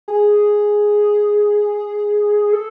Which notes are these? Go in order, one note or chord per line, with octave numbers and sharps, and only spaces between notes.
G#4
A4